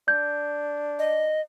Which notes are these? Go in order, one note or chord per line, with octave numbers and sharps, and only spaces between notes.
D4 G6
D#5